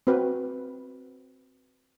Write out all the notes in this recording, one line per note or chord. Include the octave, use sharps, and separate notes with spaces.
C4 F#4 B4